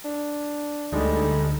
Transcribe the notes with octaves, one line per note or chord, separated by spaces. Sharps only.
D4
D2 D3 G3 G#3 D#4 A4